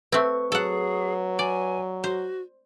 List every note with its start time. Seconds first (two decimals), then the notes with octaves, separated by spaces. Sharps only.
0.12 A3 C4 B4 C#6
0.52 F#3 G#4 A4 F#5
1.39 D5 G#5
2.04 F#4 C5